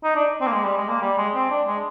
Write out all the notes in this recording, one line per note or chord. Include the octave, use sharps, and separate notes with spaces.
D#4
D4
C4
A#3
G#3
G3
G#3
A#3
G3
G#3
C4
D4
G#3